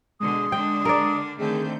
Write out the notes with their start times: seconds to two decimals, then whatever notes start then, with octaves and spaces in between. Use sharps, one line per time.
0.20 B2 D3 G#3 C6 D#6
0.52 D3 D4 G5
0.85 A#4 D5
1.39 D3 D#3 A3 C4 G#4 G6